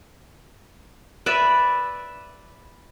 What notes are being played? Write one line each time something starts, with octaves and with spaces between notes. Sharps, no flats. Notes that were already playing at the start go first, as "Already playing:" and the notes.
B4 D5 E5 B5